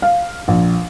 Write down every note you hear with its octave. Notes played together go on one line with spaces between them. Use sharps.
F5
A#1